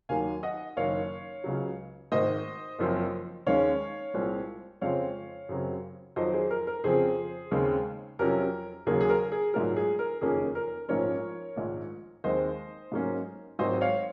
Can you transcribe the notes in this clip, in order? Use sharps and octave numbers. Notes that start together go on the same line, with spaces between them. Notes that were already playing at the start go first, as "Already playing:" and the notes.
D#2 D#3 F#3 A#3 F5 G#5
D#5 F#5
F#1 F#2 D#3 C#5 F5
C#2 C#3 F#3
G#1 G#2 D#3 C5 D#5
F#1 F#2 F3 C4
D#2 D#3 G#3 C#4 C#5 F5
C2 A#2 G#3 C4
F2 C#3 G#3 C4 C#5 F5
F#2 C#3 F#3 C4
F2 D#3 F#3 C5 D#5
G#4 C5
A#4
A#4
F2 C#3 F3 C4 G#4 C5
D#2 C#3 G#3 C4
F2 C3 F#3 C#4 A#4
D#2 C#3 F#3 A#3 G#4
G#4
A#4
G#4
A#1 G#2 F#3 A#4
G#4
A#4
F#1 F2 D#3 A#3 C#4 G#4
A#4
A#1 G#2 F3 A#3 C#4 A#4 C#5
A#1 G#2 D#3
D#2 D#3 G#3 C4 C5 D#5
G#2 F#3 A#3 C#4
G#1 G#2 F#3 C4 C5 D#5
C#5 F5